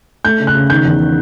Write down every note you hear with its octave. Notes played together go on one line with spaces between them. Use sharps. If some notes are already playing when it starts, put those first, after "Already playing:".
A3 G6
C#3
F#6
C#3
D#3 G6
E2